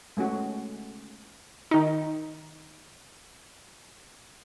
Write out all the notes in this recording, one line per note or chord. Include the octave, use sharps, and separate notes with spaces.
G#3 A3 C#4 F#4
D#3 D#4